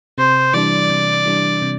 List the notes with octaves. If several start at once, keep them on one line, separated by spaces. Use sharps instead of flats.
C3 C5
E3 G3 D4 D5
C3
E3 G3 D4
C3